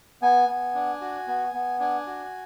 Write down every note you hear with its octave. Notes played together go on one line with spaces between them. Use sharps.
B3 G#5
B3
D4
F#4
B3
B3
D4 G#5
F#4